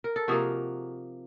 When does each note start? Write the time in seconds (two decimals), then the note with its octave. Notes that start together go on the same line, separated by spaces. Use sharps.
0.04 A#4
0.16 A4
0.28 C3 F3 A#3 D#4 F#4 G#4